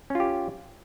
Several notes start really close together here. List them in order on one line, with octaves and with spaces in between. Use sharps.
C#4 F4 G4